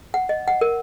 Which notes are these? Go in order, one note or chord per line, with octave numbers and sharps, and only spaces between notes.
F#5
D#5
F#5
A#4